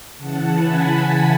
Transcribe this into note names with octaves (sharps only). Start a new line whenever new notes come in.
C#3 E3 F#5 A5
G#5 B5